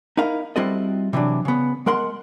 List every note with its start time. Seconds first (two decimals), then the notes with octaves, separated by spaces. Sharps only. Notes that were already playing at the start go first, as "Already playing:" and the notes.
0.17 D#4 E4 A#4 F5
0.56 G3 C4 E4 F#4 A4 D#5
1.13 C3 E3 F#3 D4
1.45 C#3 B3
1.86 G#3 A#4 F#5 C6